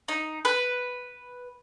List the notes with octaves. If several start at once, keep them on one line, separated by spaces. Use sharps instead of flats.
D#4
B4